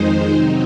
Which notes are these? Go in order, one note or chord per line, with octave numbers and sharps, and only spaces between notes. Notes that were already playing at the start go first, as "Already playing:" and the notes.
Already playing: F2 D#3 G#3 D#4 C5
C3 F#3 C4 D#4